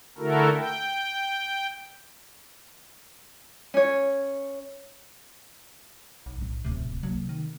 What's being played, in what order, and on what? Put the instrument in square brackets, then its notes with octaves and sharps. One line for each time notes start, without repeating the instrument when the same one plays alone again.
[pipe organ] D3 A3 E4 F#4 A4 A#4
G5
[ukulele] C#4 C#5
[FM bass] B1
[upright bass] A2 D4
[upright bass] D1 B1 [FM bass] C3
[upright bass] C3 A#3 [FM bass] F#3
[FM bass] D#3